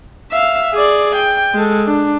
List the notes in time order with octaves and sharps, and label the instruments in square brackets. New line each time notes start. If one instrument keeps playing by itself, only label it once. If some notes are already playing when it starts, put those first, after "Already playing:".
[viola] E5 F5
G#4 D5
G5
G#3 A4
D4